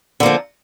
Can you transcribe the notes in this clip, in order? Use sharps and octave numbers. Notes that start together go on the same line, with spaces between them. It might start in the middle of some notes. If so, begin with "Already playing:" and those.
D3 F3 A#3